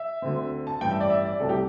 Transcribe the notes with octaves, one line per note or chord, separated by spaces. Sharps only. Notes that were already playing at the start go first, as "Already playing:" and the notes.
Already playing: E5
D2 D3 C4
A5
A1 G2 G3 G5
E5
D5
E5
D5
C2 C3 A3 A4
G4